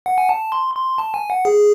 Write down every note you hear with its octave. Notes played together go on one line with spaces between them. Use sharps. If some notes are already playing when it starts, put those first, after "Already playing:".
F#5
G#5
A5
C6
C6
A5
G#5
F#5
G#4